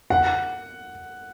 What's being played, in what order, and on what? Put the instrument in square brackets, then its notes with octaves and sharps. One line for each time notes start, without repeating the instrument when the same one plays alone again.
[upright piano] F#5